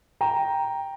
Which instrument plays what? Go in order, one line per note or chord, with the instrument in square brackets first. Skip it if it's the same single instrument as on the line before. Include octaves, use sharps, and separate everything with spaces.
[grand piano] G5 A#5